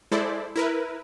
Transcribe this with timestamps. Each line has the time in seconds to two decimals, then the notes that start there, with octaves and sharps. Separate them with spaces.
0.12 G#3 E4 A4 C5 D5
0.56 E4 A#4 B4